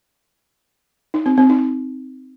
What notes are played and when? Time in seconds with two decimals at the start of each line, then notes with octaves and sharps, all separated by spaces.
1.14 D#4
1.26 C4
1.38 C4
1.49 D#4